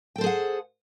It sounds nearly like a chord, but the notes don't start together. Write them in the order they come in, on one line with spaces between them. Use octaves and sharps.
G5 A4 C5 G#4 F#5